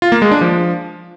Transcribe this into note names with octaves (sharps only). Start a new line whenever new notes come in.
F4
A#3
G#3
D4
F3